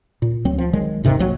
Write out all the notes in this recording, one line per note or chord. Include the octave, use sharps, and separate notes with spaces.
A#2
D2 F#3 C4
F3
B1 D#3 F#3 G#3
D#1 G#2 C3 D#3
A#1 F#3 A#3